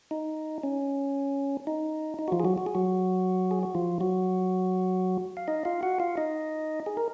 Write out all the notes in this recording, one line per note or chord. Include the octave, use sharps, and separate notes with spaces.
D#4
C#4
D#4
D#4
F#4
F3 F4
G#4
F#3 F#4
F#4
G#4
F#3 F#4
G#4
F#4
F3 F4
F#3 F#4
F5
D#4 D#5
F4 F5
F#4 F#5
F4 F5
D#4 D#5
G#4
A#4